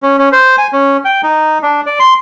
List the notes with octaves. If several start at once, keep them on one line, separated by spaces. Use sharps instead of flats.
C#4
C#4
C5
G#5
C#4
G5
D#4
D4
D5
C6